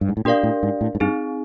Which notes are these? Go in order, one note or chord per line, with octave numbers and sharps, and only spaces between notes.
G2
G#2
A2
A#2 D4 G4 A#4 D5 F5
A2
G#2
A2
G#2
G2 C4 D#4 G#4